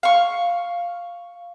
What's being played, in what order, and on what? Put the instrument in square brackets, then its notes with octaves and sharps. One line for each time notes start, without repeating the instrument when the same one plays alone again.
[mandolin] F5 C#6